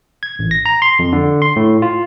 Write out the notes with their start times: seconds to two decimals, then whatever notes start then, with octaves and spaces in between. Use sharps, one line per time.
0.23 G#6
0.39 A1
0.51 A#6
0.66 A#5
0.82 C6
0.99 F2
1.13 D3
1.42 C6
1.56 A2
1.82 F4